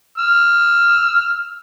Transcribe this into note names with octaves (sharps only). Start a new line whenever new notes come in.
E6 F6